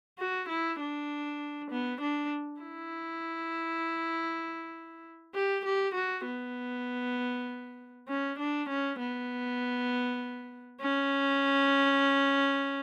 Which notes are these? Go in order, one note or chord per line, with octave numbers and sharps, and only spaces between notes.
F#4
E4
D4
B3
D4
E4
G4
G4
F#4
B3
C#4
D4
C#4
B3
C#4